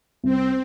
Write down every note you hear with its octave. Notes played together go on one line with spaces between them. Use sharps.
C2 C4